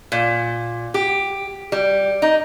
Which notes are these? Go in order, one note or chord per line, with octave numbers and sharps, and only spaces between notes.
A#2
G4
G3
D#4